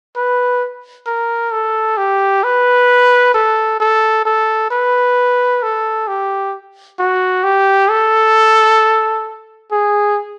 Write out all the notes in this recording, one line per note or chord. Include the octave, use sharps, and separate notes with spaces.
B4
A#4
A4
G4
B4
A4
A4
A4
B4
A4
G4
F#4
G4
A4
G#4